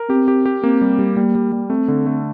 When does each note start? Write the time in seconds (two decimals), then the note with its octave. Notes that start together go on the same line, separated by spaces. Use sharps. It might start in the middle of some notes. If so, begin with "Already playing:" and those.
Already playing: A#4
0.09 C4 G4
0.28 G4
0.46 G4
0.63 A#3 C4
0.81 G3
0.99 G3
1.17 G3 A#3
1.35 G3
1.52 G3
1.70 A3 C4
1.88 D3
2.06 A3